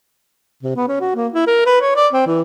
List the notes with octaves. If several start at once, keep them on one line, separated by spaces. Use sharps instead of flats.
C3
B3
C#4
F#4
A#3
E4
A#4
B4
C#5
D5
C4
E3